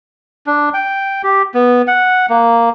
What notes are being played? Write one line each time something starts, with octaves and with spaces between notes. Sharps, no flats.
D4
G5
G4
B3
F#5
A#3